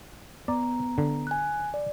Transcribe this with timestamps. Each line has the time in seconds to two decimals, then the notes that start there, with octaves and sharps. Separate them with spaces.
0.48 B3 D5 A#5
0.98 D3
1.27 G#5 F#6
1.74 D5